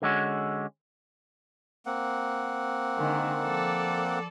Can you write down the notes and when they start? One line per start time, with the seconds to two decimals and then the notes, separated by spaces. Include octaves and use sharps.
0.02 D3 G#3 C#4 F#4
1.86 A#3 C4 F#5
2.96 D3 D#3 G#3
3.43 F3 A4 D5